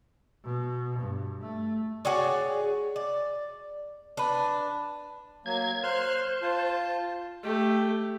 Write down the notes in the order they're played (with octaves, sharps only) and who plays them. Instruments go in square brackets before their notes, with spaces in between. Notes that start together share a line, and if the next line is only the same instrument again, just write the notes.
[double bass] B2
G2
A3
[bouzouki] F#4 G#4 C#5 D5
D5
D4 B4
[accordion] F#3 A#3 [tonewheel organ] G#6
[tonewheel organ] C5 [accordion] C6 F6 F#6
[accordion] F4 A5
[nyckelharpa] A3 G4